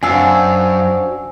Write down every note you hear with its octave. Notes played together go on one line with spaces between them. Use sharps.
F#2 C4 D4 F#4 F5 G#5 E6